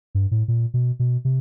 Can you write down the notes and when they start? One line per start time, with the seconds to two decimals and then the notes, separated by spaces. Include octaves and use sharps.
0.15 G2
0.31 A2
0.48 A#2
0.74 B2
0.99 B2
1.25 C3